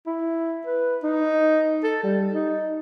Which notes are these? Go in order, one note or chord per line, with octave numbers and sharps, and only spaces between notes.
E4
B4
D#4
A4
G3
D#4